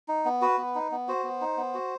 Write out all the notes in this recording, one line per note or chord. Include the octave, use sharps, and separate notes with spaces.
D#4
B3
F#4 B4
B3
D#4
B3
F#4 C5
B3
D#4
B3
F#4